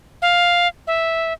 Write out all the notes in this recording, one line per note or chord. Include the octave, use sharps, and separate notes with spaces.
F5
E5